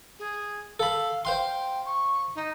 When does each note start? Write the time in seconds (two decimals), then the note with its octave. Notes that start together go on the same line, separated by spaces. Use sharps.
0.19 G#4
0.80 A4 F5 B5
1.25 C5 F5 G5 C6
1.85 C#6
2.35 D#4